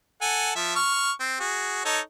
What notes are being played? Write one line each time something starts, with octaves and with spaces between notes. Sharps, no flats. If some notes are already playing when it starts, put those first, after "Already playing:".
A4 F#5 G#5
F3 E5
C#6 F6
C4
F#4 G#4
D#4 A4 C#5